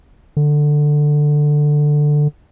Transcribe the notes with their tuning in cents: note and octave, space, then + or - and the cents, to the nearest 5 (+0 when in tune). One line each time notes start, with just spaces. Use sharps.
D3 +10